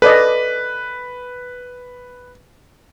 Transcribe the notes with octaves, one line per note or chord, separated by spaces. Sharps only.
A4 B4 D5 D#5